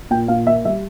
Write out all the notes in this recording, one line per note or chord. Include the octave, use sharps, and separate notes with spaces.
A#2 G5
A#2 F5
A#3 E5
G3 E5